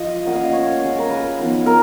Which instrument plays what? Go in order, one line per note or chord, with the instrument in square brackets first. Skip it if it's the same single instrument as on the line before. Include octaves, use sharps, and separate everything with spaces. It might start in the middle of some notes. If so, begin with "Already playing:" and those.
Already playing: [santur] F3 F4 D#5
A#3 C#4 F4 F#5
F5
D#5
C#5
G#3 C#4 F4
A#4
B4
F3 B3 D#4
A#4